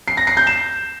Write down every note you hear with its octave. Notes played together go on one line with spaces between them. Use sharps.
C7
A#6
C7
G6
E7